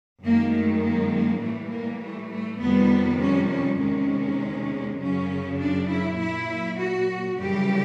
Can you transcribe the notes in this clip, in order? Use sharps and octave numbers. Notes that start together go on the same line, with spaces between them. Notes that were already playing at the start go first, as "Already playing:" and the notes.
F#2 D#3 G#3 A#3
A3
A#3
A#3
A2 E3 G3 A3
A#3
A3
A3
F2 C3 D#3 G3 B3
C#4
C#4
E2 C3 D#3 G#3 C#4
F#2 C#3 F#3 C#4
D4
E4
A#2 F#3 E4
F#4
F#2 C#3 E3 G3 G4